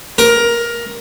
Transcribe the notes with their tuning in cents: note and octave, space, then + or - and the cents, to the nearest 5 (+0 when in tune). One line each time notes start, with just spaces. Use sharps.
A#4 +15